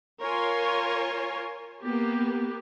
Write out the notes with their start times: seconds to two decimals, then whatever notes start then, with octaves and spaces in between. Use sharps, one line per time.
0.21 F4 A#4 C#5 G#5 C6
1.82 A#3 B3 G4